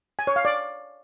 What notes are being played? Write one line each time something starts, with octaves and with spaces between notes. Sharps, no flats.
G#5
C#5
F5
D5